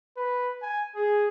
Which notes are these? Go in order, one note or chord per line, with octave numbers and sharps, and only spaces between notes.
B4
G#5
G#4